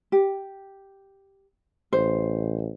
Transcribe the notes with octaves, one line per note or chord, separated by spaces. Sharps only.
G4
A1 C5